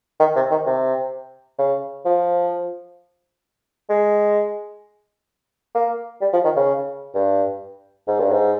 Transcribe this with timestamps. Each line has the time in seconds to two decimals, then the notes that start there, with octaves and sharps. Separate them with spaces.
0.20 D#3
0.36 C3
0.51 D#3
0.66 C3
1.58 C#3
2.06 F3
3.90 G#3
5.75 A#3
6.21 G3
6.33 F3
6.45 D#3
6.56 C#3
7.15 G2
8.07 G#2
8.20 G2
8.32 G#2